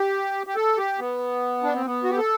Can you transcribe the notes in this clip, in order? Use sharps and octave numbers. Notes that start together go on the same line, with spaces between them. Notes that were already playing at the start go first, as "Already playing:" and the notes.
Already playing: G4
G4
A4
G4
B3
D4
C4
B3
F#4
G4
A4